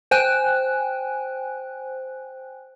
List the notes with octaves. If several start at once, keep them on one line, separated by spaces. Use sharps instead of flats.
C5 G5 G#5 F#6